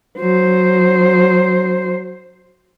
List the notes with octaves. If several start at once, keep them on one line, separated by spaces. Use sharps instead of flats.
F#3 C5